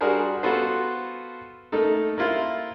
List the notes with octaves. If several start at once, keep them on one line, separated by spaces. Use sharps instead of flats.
G3 D4 F#4 G#4 A#4 C5
B3 F4 F#4 A4 B4 C5
A3 A#3 D#4 A4
A#3 E4 F4 C5